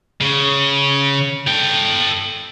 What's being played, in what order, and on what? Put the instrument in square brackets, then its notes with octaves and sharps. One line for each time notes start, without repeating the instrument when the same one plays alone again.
[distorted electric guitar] C#3
A4 G5